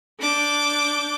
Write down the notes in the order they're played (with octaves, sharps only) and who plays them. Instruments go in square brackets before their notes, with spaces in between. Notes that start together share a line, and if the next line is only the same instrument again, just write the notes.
[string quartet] D4 D6 G6